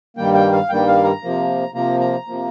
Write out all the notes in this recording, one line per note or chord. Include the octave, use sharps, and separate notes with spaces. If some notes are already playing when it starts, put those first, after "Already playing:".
G2 D#3 G3 A#3 G5
G5
F5
G2 D#3 G3 A#3 G5
F5
A#5
C3 F3 A#3
C3 F3 A#3 A#5
A#5
C3 F3 A#3